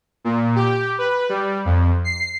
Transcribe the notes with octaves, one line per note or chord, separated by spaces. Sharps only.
A#2
G4
B4
G3
F2
C7